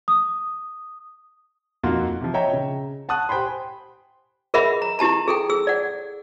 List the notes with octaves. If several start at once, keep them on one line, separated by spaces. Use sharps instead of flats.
D#6
F2 A#3 D#4 F4 F#4 C6
C3 F3
C#5 D#5 E5 G5 A#5
C#3
F#5 A5 C#6 D#6 F#6
G4 C5 G5 G#5 B5 C6
G#4 A#4 D#5 E5 F#5 B5
A#5
E4 G4 A5 A#5
G#4 A4 G5
G#4 E6
D5 F#5